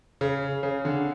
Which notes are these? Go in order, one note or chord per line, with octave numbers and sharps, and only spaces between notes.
C#3
C#3
D3